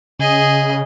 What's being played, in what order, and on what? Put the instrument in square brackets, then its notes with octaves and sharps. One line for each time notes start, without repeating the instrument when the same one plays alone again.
[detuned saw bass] C#3 [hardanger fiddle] G#4 D#5